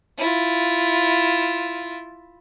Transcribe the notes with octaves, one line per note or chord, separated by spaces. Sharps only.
E4 F4